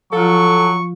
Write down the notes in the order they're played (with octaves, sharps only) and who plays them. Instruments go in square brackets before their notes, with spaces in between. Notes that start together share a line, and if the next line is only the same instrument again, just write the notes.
[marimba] F3 F4 [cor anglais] F#3 [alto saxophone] A4 [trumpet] C#6